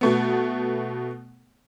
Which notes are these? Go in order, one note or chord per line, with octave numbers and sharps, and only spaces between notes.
B2 A3 B3